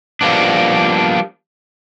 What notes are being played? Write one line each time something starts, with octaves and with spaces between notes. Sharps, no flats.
F3 G3 A#3 B3 D4